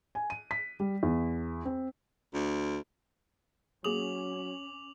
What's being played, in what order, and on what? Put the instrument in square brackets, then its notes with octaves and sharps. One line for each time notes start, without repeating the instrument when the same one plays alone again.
[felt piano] G#5
D#7
B6
G3
E2
C4
[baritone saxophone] D2
[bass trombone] F#3 [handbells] A#3 G#4 D#6 [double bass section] C#4 [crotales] D6 F7 F#7